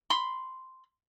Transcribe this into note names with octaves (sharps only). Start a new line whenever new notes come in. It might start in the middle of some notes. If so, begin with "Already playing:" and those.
B5 C6